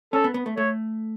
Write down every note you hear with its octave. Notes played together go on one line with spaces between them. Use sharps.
C#4 A4
B3
B3
A3
A3 C#5